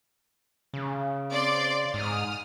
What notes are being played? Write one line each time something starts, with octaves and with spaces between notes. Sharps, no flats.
C#3
C4 D5 C6
G#2 D#6 F6